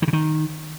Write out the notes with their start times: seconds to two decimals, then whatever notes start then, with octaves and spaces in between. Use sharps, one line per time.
0.02 D#3
0.08 C#3
0.13 D#3